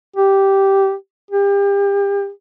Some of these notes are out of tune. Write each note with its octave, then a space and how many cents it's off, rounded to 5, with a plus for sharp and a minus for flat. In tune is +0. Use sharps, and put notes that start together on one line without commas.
G4 -5
G4 +35